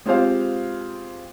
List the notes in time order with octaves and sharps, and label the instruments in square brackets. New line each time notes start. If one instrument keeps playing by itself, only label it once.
[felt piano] G#3 C4 F4 G4 C5 F5